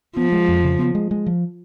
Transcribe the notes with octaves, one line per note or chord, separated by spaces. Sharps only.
F3 B3
G#3
F2
C#3
B3
G#3
G#3
F3